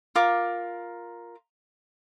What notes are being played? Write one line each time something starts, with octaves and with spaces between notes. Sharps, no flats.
F4 A#4 D6